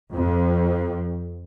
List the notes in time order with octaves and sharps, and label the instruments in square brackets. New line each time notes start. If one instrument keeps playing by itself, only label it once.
[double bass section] F2